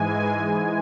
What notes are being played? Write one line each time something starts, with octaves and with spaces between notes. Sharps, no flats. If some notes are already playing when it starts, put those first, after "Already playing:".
Already playing: G#2 E3 G#3 G#5